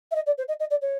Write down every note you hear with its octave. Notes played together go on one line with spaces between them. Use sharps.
E5
D#5
D5
C5
D#5
D#5
D5
C#5